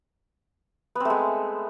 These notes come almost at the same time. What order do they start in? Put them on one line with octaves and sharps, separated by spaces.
B3 C4 A3 G#3